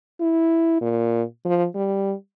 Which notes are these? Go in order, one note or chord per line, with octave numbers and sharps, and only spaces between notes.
E4
A#2
F3
G3